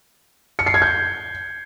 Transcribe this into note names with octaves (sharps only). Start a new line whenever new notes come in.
C#7
C7
G#6
G6